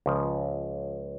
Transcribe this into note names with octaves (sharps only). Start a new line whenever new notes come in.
C#2 C#3 F3